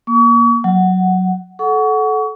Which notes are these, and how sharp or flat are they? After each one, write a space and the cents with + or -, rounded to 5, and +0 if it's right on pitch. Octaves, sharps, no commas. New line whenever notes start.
A#3 +25 C#6 +40
F#3 +0 F#5 +10
A4 -25 F#5 +0 C#6 +30